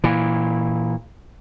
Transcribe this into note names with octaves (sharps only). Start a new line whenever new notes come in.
A#2 E3